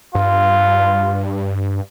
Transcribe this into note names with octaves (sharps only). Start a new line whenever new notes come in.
G2 F4